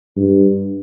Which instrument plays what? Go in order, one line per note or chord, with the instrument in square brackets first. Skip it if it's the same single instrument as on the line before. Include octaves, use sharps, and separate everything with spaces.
[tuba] G2